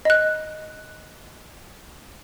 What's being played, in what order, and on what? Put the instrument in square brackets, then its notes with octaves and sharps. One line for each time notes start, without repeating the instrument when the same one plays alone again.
[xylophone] D#5 F#6